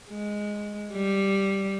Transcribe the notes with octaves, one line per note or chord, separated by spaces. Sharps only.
G#3
G3